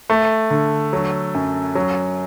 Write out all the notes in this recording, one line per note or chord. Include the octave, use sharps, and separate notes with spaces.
A3
D3
F#3
F#2
F#3